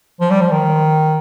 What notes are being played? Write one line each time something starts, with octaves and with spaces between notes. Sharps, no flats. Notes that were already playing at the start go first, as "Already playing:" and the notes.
F3
G3
F3
D#3